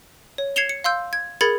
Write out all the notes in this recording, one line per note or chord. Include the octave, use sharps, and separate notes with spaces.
C#5
G#6 C7 C#7 E7 F7 G7
C#7
F5 C6 E6 G6
G#6
G#4 A#4 B5 G#6 A6 C#7